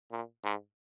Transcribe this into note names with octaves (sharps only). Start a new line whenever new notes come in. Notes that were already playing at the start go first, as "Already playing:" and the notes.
A#2
G#2